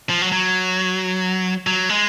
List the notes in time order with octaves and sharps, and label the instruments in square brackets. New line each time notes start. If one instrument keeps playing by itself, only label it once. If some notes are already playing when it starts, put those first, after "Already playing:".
[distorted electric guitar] F3
F#3
F#3
F#3
G#3